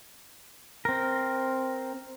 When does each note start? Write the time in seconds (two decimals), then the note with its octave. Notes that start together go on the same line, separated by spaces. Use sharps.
0.85 C4 A#4